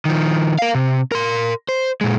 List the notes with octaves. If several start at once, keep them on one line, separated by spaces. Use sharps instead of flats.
D#3 F3
A#4 F5
C3
A#4 C6
C5
A#2 G#3